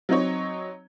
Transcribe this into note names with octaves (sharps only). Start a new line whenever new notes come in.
F#3 C4 D#4 C#5